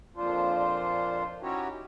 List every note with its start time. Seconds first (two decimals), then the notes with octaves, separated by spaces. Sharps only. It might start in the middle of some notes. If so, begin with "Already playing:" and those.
0.16 F2 A#2 F3 D4 F4 C5
1.42 C#4 D#4 E4 F#4 G4 C#5